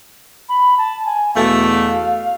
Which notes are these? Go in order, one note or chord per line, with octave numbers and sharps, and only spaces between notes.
B5
A5
G#5
E2 B2 A3 F5